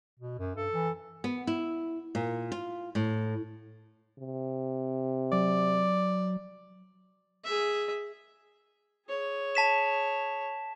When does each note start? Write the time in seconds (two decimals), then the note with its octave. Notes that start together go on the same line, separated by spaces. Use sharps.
0.19 B2
0.39 F#2
0.55 G2 A4
0.71 E3
1.24 B3
1.47 E4
2.15 A#2
2.52 F4
2.95 A2
4.19 C3
5.32 F#3 D5
7.44 G#4 E5
9.07 G#4 C#5
9.55 A5 B6 E7